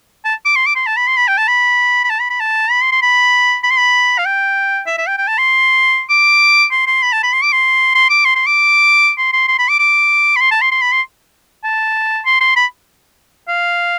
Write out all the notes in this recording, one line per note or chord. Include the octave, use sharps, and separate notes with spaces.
A5
D6
C6
D6
C6
A5
B5
C6
B5
G5
A5
B5
B5
A5
B5
B5
A5
B5
C6
C6
B5
B5
C6
B5
F5
G5
E5
E5
G5
G5
A5
C6
D6
C6
C6
B5
A5
B5
C6
D6
C6
C6
D6
C6
C6
D6
C6
C6
C6
B5
D6
D6
B5
C6
A5
C6
C6
B5
C6
A5
C6
C6
B5
F5